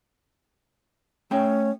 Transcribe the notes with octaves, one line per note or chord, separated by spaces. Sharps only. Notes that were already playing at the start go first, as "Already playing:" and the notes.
A3 C#4 E5 G5